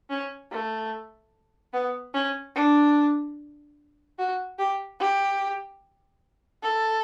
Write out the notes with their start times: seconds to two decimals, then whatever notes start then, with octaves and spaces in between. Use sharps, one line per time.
0.10 C#4
0.51 A3
1.73 B3
2.14 C#4
2.55 D4
4.18 F#4
4.58 G4
5.00 G4
6.63 A4